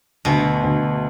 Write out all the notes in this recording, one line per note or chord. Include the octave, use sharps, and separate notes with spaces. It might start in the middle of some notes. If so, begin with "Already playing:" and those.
D2 B2
D2